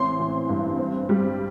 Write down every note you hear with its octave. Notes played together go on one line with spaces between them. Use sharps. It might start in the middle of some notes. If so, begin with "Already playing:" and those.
Already playing: A1 C4 C6
E3
G2
C4
G3